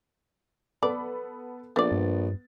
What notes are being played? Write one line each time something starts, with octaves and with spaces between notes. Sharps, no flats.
B3 A4 D5 B5
A#1 A3 B3 D5 A6
G2